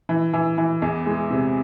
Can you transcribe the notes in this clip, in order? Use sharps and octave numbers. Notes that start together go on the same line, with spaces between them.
E3
E3
E3
E2
G#3
C3